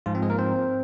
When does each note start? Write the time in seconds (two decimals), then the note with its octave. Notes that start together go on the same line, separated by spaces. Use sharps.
0.06 G#2 F3 F4
0.15 C4
0.22 G#3 G#4
0.30 A#3 A#4
0.39 C4 C5